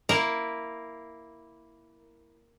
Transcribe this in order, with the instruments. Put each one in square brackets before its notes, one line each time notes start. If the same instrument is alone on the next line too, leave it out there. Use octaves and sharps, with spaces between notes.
[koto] A#3 E4 A#4